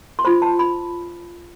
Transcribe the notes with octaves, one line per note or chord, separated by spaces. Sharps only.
C6
F4 C5 B5
A5
B5